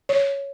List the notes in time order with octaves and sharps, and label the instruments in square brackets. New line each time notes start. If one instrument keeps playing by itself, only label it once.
[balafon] C#5